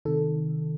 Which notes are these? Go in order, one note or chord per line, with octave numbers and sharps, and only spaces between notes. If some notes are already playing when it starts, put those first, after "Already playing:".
C3 D#3 A4